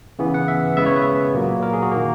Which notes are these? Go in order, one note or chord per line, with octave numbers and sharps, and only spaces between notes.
C#3 E3 B3
F#5
E5
C#3 G#3 B3 E5
C#5
B4
A#2 F#3 A#3
A#4
G#4
F#4
D#3 A#3